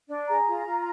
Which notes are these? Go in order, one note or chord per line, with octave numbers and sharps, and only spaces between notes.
D4
G#4 A#5
F4
F4